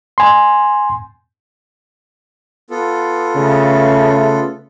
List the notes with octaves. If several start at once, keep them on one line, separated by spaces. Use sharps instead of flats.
G#5 C6
B3 F4 A4
C#3 A3